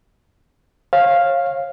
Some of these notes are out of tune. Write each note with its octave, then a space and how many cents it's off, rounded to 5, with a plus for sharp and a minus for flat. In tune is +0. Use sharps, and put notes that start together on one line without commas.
C#5 -30 F5 +0